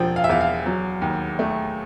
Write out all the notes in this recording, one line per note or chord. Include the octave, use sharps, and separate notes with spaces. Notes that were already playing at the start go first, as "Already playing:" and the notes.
Already playing: E1 F3 G5
F5
E5
E2 F5
F5
F#3
D#2
A3